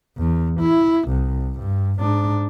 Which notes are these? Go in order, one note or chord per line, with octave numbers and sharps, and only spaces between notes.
E2
E4
C2
G2
G#2 D4